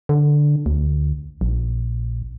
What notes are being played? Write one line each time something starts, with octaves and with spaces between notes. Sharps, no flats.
D3
D2
A#1